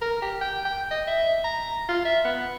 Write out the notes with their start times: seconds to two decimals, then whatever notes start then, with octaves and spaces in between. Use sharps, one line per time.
0.02 A#4
0.22 G4
0.41 G5
0.65 G5
0.91 D#5
1.07 E5
1.45 A#5
1.89 F4
2.05 E5
2.25 B3